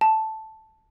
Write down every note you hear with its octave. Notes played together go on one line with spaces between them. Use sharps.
A5